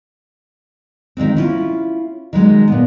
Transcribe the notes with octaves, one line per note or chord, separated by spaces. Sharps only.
D#3 F3 G#3 C4
C#4 E4 F4
D#3 F#3 G#3 A#3
A#2 B3